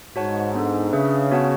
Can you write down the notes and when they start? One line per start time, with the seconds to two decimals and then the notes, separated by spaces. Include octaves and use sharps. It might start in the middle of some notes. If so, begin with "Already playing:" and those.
0.15 G#2 F#4 C#5 F#5 A5
0.54 B3 D4 A4
0.93 C#3 D4 G#4 B4 E5
1.31 B3 F#4 C#5 F#5 A5